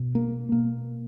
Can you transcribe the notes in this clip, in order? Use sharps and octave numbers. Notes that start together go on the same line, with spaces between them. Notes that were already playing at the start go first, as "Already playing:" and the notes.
Already playing: B2
A#3
B2 A#3